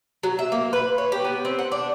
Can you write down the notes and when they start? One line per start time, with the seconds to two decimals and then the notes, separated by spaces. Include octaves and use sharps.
0.23 F#3
0.39 E5
0.52 A#3
0.73 B4
0.98 C#5
1.12 G4
1.24 B3
1.45 C4
1.59 F#5
1.72 D4